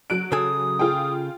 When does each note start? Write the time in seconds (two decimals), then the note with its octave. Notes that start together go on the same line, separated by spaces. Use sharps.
0.10 F#3 F#6 D7
0.32 C#3 A4 G#5 D#6
0.79 F4 G#4 G5